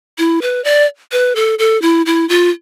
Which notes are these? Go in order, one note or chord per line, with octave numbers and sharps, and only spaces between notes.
E4
B4
D5
B4
A4
A4
E4
E4
F4